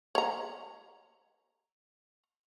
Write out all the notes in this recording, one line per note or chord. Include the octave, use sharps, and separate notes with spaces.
C#5 A#5